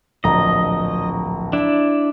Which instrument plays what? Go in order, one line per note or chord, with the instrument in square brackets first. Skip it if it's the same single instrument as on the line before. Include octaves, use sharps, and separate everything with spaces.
[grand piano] D1 A#1 A#5 [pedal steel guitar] D#5
[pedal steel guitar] D4 E4